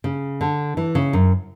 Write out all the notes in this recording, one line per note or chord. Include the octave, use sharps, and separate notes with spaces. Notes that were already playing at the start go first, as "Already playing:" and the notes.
C#3
D3
E3
C#3
F#2